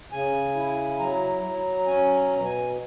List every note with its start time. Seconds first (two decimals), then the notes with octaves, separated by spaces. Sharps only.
0.11 C#3 G#5
0.55 E4
0.99 F#3 A#5
1.43 F#3
1.86 C#4 G#5
2.14 A#5
2.30 B2
2.44 G#5